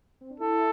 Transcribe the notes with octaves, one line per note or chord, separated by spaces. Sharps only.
C4
D4
E4 A4